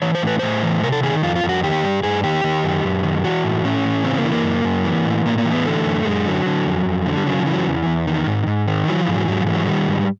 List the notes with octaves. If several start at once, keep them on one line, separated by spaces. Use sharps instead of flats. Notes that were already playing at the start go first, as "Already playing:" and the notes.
E3 C#5
C5
A2 B4
A2 C5
E3
C3 A#4
A4
D#3 G#4
F2 F4
F4
F2
F#4
D#3 G4
G2
G2 G#4
D#3 G4
D#3
F#2
F#2
D#3
E3 F#4
A2
A2 C#4
E3
C#3 C4
A#3
E3
A#3
F#2
F#2
E3
A2
A2 A#3
A#3
E3
B3
D3 A3
F#2
F#2 G#3
D3 F#3
D3
F2
F2
D3
G3
C#3 F#3
F3
E3
F#3
E2
E2
D#3
G#2
G#2
D#3
E3 F#3
F3
G#2
F#3
G#2 F#3
F3
E3
F#3
D#3 G3
G#2